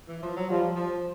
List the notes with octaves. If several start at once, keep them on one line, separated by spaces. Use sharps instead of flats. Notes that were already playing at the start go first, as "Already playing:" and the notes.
E3
F3
F#3
F3 G3
F3